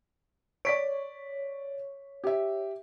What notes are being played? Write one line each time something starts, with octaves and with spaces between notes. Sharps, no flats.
C#5 D5 B6 D7
G4 E5